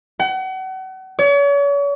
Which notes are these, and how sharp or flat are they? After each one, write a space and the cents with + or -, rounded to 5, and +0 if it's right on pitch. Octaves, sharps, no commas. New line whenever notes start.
F#5 +35
C#5 +40